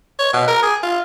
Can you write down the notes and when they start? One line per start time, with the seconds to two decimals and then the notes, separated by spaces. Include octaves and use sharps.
0.19 C#5
0.33 B2
0.47 A#4
0.63 G#4
0.83 F4